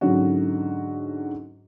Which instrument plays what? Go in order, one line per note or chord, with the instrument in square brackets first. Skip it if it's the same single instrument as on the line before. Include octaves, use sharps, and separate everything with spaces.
[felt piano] G#2 D3 F#3 C#4 F#4